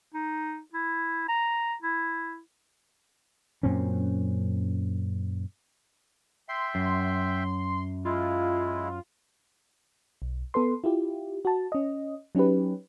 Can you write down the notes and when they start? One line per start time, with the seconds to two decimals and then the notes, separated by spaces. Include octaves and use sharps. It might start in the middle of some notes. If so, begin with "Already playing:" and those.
0.14 D#4
0.73 E4
1.29 A#5
1.82 E4
3.63 F#2 A#2 C4 C#4
6.49 E5 G5 C6
6.75 F#2
8.05 G#3 E4 F4
10.22 B1
10.54 B3 A4 B4 C6
10.84 E4 F4 G4
11.45 F#4 A5
11.72 C#4 D#5
12.35 F#3 C#4 D#4 G4 B4